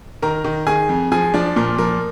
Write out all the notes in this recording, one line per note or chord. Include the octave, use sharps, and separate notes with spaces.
D#3 A#4 A#5
D#3
D#3 G#4 G#5
F2
F3 G#4 G#5
F3 D4 D5
A#2 A#4
F3 A#4